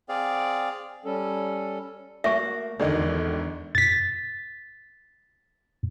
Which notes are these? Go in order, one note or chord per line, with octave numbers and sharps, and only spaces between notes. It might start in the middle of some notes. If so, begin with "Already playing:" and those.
C4 G#4 D5 F5
G3 C#4 A4
A3 A#3 F#4 E5 C#6
G#1 E2 D3 D#3 D5 D#5
A6 B6